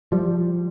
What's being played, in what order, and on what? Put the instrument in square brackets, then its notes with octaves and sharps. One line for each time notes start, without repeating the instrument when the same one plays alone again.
[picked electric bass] F3 G3